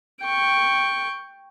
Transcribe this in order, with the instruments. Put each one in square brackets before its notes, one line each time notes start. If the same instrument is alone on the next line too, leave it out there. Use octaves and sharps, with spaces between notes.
[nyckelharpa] G5 C#6